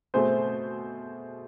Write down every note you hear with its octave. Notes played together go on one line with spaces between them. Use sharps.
B2 A3 C4 G#4 C5